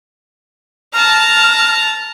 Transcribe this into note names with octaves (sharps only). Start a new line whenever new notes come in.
A5 A#5 F6